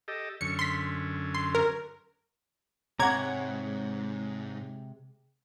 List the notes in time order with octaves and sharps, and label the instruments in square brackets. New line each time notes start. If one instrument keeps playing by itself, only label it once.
[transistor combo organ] G4 A4 D#5
[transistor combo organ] F#2 D3 C#4 [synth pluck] C#7
[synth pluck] C6 B6
C6
A#4
[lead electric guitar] G#2 [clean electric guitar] C3 G#3 [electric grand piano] C#5 F#5 [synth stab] A#5 D6 G#6